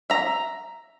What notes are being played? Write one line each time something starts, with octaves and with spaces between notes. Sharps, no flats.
E5 A#5